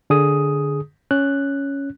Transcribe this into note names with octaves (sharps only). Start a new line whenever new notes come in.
D3 G#4 D#6
C#4 F#6